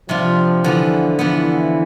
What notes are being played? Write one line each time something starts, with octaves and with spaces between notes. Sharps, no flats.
C3 F3 G3 D4 F4
D3 E3 F3 B3
D3 E3 F3 B3